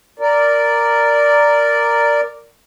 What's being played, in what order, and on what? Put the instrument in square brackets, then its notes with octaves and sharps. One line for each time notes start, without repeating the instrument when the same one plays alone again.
[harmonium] A#4 D5